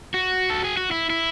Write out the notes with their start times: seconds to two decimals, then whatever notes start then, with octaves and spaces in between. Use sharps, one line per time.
0.14 F#4
0.50 A4
0.64 G#4
0.77 F#4
0.91 E4
1.10 E4